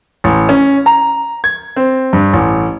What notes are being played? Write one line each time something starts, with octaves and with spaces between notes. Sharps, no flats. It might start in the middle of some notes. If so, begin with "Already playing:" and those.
A1
C#4
A#5
G#6
C4
G2
A1